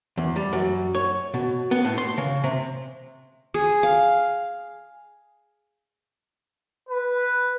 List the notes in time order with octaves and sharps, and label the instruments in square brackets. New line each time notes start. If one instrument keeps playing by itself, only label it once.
[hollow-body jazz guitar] E2
G3
F#2
C#5
B2
B3
A2
C6
C#3
C3
[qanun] G#4
F5
[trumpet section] B4